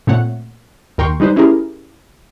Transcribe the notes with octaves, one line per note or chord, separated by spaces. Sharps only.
A#2 A3 C4 C#5 F#5
D#2 A#4 G5 C6 C#6
G3 G#3 D#4 B4 C5
C#4 E4 G4 G#4 A#4